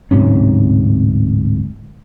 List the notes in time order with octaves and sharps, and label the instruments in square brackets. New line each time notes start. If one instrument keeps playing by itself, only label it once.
[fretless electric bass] D1 G#2 C3 C#4